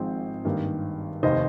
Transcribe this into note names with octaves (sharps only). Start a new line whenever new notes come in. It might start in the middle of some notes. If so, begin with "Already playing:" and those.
Already playing: G#1 G#2 F3 C4 G#4 C5
G#1 G2 D#3 A#3
F1 D#2 D#3 C5 D#5